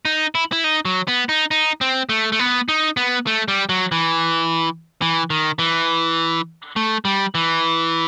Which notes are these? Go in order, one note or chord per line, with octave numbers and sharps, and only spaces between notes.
D#4
E4
E4
D#4
F#3
B3
D#4
D#4
C4
A3
A3
B3
D#4
B3
A3
G3
F#3
E3
E3
D#3
E3
A3
G3
E3